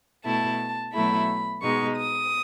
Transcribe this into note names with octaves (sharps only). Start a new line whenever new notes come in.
B2 A3 E4 A5
B2 F#3 A3 E4 B5
B2 G#3 D#4 C#6
D#6